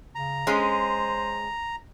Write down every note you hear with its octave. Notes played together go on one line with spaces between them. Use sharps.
C#3 A#5
G#3 C#4 C5